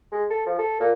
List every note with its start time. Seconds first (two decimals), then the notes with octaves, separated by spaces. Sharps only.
0.12 G#3
0.30 A4
0.46 F3
0.58 A4
0.80 A#2